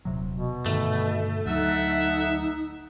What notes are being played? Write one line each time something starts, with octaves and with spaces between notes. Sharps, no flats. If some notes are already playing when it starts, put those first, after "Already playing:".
D#1 C3 F#3
B2
G2 D3 D#3 A3
D2 F#3 D#4 E5 F#5